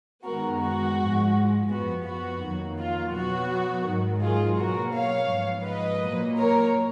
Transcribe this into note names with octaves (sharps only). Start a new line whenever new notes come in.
F#2 D#3 G#3 B3 F#4 A#4
F#4
G#2 F3 G#3
F#2 F3 B3 F#4
F#4
F2 D#3 F#3 A#3
F4
B2 F#3 B3 F#4
G#2 D#3 F#3
F4 G#4
B2 F#3 A#3 F#4 A#4
C#5 F5
G#2 F3 B3
B4 D#5
A#2 F#3 A#3
A#4 C#5